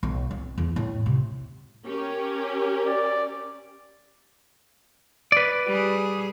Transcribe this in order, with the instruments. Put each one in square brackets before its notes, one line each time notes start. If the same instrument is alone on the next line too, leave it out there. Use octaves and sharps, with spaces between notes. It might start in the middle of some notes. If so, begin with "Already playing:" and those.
[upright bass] B1
C4
E2
A2
C3
[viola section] C#4 G4 A#4
[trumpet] D5
[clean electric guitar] B4 D5
[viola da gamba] G3 G#4